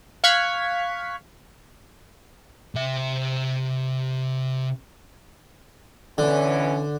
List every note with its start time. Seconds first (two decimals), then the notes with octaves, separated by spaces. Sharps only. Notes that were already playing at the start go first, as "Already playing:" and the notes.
0.24 F5 C#6 F6 F#6 G#6 B6
2.75 C3 E5
6.18 B2 D3 E3 C#4